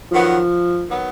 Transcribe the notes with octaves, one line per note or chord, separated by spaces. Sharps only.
D#3 F3 F#3 B3
D#3 F#3 B3